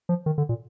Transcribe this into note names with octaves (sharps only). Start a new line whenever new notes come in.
F3
D#3
D3
A#2